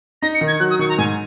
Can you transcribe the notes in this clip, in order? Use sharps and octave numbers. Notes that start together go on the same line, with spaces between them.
D#4 A#6
C#7
D#3
G#6
F#3 F#6
D#6
D#3 C#6
A#5
G#2 G#5